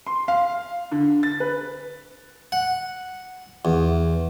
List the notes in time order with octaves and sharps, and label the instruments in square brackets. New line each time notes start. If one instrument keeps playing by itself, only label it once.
[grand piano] C6
F5
D3
A6
B4
[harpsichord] F#5
E2